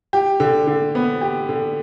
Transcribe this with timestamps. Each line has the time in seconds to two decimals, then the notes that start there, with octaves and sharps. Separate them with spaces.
0.13 G4
0.40 D3
0.67 D3
0.95 B3
1.21 G4
1.49 D3